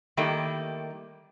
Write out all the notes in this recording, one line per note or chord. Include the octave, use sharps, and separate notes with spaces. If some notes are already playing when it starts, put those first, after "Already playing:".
D#3 G3 A3 A#3 E4